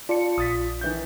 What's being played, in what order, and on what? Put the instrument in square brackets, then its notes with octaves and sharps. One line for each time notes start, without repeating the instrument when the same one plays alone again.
[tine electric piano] F4 [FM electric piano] D5 C#7 [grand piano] A5
[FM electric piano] A#1 [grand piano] D#6 A6 B6
[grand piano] D#3 E3 G6